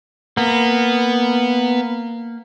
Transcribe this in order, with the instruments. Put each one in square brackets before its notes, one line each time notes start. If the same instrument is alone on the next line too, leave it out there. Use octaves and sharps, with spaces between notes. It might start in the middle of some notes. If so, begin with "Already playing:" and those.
[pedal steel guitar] A#3 [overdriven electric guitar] B3